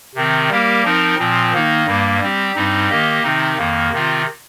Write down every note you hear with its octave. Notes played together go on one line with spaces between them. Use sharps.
C3 D#3 C4
G3 A#3 G4 A#4
F3 C4 D#4 A#4
A#2 F3 C4
D#3 A#3 D#4
G2 G3 A#3
G3 C4 G4
G2 G3 C4 D#4
D#3 A#3 G4 D#5
C3 D#3 C4 D#4
F2 D#3 A#3
C3 D#3 C4 F4